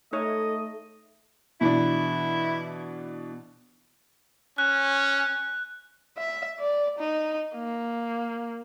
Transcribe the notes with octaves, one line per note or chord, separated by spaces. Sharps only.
A3 D#4 A4 C#5 D#5
B2 E3 D4 E4
C#4 F#6
E5
D5
D#4
A#3